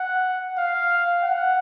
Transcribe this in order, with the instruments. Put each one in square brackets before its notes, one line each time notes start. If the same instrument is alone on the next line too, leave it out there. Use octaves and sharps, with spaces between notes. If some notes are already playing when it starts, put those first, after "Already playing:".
Already playing: [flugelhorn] F#5
F5
F#5